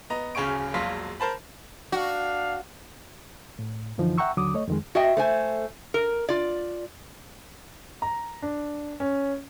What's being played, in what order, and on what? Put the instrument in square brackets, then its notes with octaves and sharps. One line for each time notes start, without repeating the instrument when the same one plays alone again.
[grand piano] B3 D#5 A#5
D1 C#3 C#4 G#4 C#6 D7
E1 A#1 F#3 F5 C6 B6
A#4 C5 A5 B5
[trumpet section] D4 F5 [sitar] F#4
[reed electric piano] A2
F#2 D3 E3 F3 D#4
E5 F#5 G5 A#5 C#6 E6
D#2 D3 F#3 D6 D#6
A3 C#5 D#5
F2 D#3 G#3
[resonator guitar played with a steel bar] F#4 D#5 E5 G5
A3 C5 G#5
A#4
F4 D5
[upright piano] A#5
D4
C#4